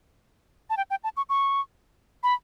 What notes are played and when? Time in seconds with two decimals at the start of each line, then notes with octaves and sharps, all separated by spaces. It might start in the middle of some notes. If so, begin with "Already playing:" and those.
0.70 A5
0.77 G5
0.90 G5
1.04 A5
1.17 C#6
1.29 C#6
2.23 B5